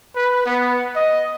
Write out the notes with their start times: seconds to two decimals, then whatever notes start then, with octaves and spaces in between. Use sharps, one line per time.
0.16 B4
0.46 B3
0.96 D#5